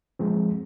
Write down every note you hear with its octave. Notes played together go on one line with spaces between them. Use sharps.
F3 G#3 C4